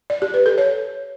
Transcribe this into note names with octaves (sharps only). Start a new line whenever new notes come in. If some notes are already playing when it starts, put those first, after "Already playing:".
D5
G4
B4
A4
C#5